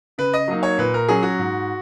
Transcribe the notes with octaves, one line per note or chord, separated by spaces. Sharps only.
C#3 B4
D#5
F#3 A#3 D#4
C#5
A#2 B4
A#4
F#3 C#4 G#4
F#4
G#2